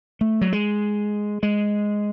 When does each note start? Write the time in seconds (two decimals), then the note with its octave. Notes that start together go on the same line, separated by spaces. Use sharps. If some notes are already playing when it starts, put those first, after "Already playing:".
0.21 A3
0.41 F#3
0.52 G#3
1.43 G#3